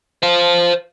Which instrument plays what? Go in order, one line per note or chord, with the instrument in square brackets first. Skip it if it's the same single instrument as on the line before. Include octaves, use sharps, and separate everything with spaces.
[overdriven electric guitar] C5 F5